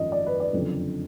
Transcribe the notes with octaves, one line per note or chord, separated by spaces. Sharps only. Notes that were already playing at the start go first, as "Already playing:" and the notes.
Already playing: G#1 F#2 F3 D#5
D5
B4
D5
F#1 F2 D3 F3